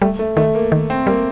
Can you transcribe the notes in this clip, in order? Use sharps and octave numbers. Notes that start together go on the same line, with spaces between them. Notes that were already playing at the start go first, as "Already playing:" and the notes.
G3 A3
A3
D#3 A3
A#3
D#3
C4
G3 A#3